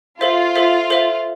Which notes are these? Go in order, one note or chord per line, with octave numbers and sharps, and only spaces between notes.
F4 A4 C5 E5
A4 C5 E5
A4 C5 E5